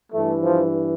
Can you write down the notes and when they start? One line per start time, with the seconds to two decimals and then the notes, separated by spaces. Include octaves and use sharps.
0.12 G2 E3 A3
0.42 F3